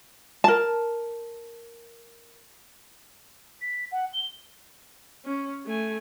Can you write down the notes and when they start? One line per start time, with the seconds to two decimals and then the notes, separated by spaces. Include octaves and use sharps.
0.44 A#4 A5
3.62 B6
3.92 F#5
4.13 G7
5.25 C#4
5.66 A3 G#5